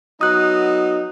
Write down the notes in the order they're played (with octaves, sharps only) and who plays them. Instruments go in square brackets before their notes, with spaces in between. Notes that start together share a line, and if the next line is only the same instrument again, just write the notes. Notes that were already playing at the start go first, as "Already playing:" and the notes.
[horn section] F#3 B3 D#4 [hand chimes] D#6 F#6